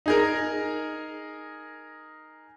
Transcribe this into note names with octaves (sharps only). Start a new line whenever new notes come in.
D#4 G#4 A#4